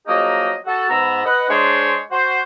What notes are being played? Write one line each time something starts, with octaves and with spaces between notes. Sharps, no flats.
F3 F#3 A#3 D#4 G#4 D#5
F#4 A4
G#2 B3 A#5 E6
B4 D#5 F#5
G#3 D4 C5 C#5
F#4 C5